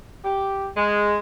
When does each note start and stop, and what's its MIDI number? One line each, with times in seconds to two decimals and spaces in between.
0.24 0.67 67
0.76 1.16 56